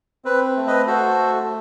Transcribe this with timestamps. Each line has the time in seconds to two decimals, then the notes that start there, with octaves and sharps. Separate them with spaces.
0.25 C4 B4
0.57 A3
0.67 B4 D#5
0.87 F#4 A4 C5
1.19 A3